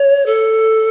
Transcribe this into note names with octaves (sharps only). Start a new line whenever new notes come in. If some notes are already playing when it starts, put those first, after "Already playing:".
Already playing: C#5
A4